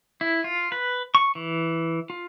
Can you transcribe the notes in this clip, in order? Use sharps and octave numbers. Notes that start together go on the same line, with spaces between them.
E4
F4
B4
C#6
E3
F4